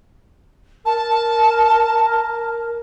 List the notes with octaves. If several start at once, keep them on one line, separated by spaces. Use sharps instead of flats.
A#4 A5